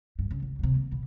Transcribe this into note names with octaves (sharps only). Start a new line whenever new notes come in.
G2
C#3
C#2
C3 F#3
A#3
B2